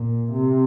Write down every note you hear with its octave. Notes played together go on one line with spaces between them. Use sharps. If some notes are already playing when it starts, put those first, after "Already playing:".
Already playing: A#2
C3